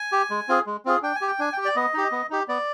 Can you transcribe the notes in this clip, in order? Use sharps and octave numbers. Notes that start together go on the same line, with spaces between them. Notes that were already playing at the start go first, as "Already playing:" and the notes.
Already playing: G#5
G4
G#3
C4 F4 G#4
G#3
C4 F4 G#4
D4 G5
G#5
G4
G5
D4 G#5
G4 G5
D5
B3 D#5
D#4 G4
B3
D#4 G4
B3 D5